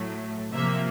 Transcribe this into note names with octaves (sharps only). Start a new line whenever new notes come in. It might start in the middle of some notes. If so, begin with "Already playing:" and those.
Already playing: A2 F#3 A3
C3 F3 A#3 E5